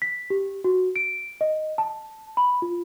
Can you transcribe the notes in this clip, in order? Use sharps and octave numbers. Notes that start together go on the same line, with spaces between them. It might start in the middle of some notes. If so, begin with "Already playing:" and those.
B6
G4
F#4
D7
D#5
A5
B5
F4